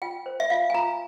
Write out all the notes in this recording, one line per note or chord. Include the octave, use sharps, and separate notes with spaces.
F4 G5
C5
E5
F4 F5
G#5
F4 A#5